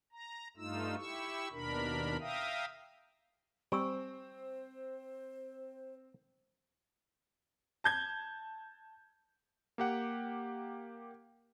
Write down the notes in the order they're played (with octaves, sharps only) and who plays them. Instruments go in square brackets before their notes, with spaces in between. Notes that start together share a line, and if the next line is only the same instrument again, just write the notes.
[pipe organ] A#5
G2 A3 D#4 F4 E6
E4 G4 C#6 E6
D#2 B2 D4 A#4 B5
E5 F5 G5 A#5 D#6
[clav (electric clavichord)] G3 [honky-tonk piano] C4 [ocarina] C5 [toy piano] G#5 C#6 E6
[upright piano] A5 G6 G#6
[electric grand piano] A#3 G4 F#5